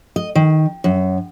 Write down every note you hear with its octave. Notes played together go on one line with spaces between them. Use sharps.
D#5
D#3
F#2